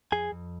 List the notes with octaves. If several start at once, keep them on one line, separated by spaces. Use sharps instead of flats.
F2 G#4 G#5
F2